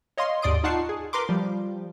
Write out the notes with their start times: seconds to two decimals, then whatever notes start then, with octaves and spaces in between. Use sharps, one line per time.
0.18 C#5 D#5 F5 C6
0.42 D#2 G#2 D5 C6 D#6 D7
0.64 D#4 F4 F#5 A5 C#6 C7
0.89 G#4
1.13 A#4 B4 C6 D6
1.29 F3 G3